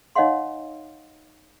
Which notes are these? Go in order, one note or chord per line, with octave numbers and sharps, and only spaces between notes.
D#4 C#5 D#5 F5 F#5 C6